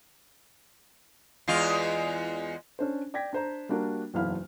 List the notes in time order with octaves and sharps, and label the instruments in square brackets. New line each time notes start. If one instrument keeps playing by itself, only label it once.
[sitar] E2 G#3 F4
[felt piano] C#4 D4 C5
D5 G5 G#6 A#6 B6
D4 C5 A#5
G3 A#3 D4 F#4 A#4
F#1 B1 E2 E4 F5 F6